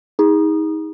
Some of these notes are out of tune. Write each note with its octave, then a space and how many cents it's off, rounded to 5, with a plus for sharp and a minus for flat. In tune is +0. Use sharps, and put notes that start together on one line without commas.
D#4 +30 G#4 -25